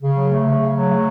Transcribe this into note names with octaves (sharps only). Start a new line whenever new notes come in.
C#3
F#3
A3
C#3
C#3
F#3
A3